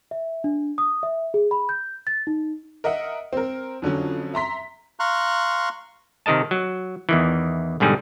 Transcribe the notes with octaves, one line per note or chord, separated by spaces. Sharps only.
E5
D4
D#6
E5
G#4
B5
G6
A6
D#4
A#4 D#5 E5 F#5
C4 A#4
F2 D3 F#3 C#4
E5 A#5 C6 B6
F5 A#5 C6 C#6 F#6
C3 D#3 A#4 D#5 A5
F#3
E2 D#3 E3
B1 G#2 D3 G3 G#4